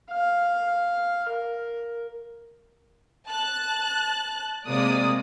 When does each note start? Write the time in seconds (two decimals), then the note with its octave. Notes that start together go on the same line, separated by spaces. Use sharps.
0.11 F5
1.29 A#4
3.26 A5 F#6
4.67 C3 G#3 A#3 D5 D#6